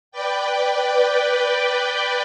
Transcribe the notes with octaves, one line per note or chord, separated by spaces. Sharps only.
B4 D5 G5